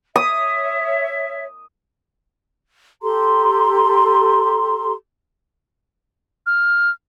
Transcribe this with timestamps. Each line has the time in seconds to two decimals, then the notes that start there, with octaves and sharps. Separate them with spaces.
0.16 C#5 E5 D#6
3.02 G4 A4 A#5 C6
6.46 F6